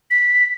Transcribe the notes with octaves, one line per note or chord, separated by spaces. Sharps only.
B6